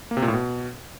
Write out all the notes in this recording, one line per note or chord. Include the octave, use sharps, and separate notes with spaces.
A#3
C3
A#2
A2
B2